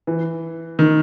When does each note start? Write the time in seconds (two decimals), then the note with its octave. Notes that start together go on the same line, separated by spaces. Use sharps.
0.07 E3
0.79 D#3